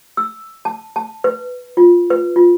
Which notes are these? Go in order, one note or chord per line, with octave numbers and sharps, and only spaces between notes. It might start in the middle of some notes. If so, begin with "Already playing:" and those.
E6
A5
A5
B4
F4
B4
F4